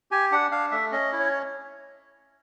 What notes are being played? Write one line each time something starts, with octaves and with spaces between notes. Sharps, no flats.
G4 G#5
D4 F#5
D4 F5
A3 E5
C#4 D#5
E4
C#5